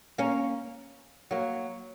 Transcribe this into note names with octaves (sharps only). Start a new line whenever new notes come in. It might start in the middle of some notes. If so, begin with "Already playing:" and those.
A#3 C#4
F#3 A#3